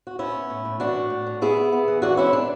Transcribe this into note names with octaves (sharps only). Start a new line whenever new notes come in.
F#4
B3 C#4 E4
B3
A2
A2
E3 D4 F#4
A2
A2
A2
B3 E4 G#4
B3
B3
E3
E3 D4 F#4
G#3 C#4 E4
E3 D4